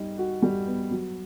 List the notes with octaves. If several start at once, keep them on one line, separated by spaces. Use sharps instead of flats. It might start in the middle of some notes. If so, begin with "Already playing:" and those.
Already playing: G3 D#4
F#4
G3
B3
F#3